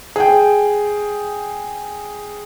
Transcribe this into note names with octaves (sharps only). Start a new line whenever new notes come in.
G#4 G5